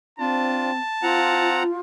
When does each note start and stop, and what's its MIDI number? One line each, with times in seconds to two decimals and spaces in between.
0.19 0.80 60
0.19 0.71 62
0.19 0.71 65
0.19 1.69 81
1.03 1.63 60
1.03 1.80 65
1.03 1.63 78
1.03 1.63 82